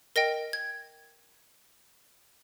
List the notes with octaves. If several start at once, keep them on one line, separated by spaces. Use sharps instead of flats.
A#4 D#5 G5 A#6
G#6